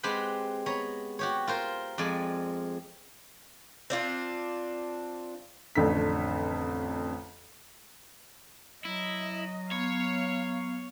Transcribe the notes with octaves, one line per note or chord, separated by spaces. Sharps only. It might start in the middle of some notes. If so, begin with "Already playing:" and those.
G#3 C4 G4 B4 F#5
B3 C#5 A#5
F#4 G4 C#5
F4 A#4 C5
F2 G#3 C4 D5 G#5
C4 D4 F4
A1 F2 D3 B6
F#3 E4 D#5
B3 C#5 F5